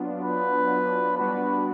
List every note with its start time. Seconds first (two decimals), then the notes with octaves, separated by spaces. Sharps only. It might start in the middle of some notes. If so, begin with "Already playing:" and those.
Already playing: F#3 B3 D4 F4
0.25 B4
1.17 G3 B3 D4 F#4 B4